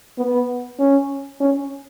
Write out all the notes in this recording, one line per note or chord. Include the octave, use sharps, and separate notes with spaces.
B3
C#4
C#4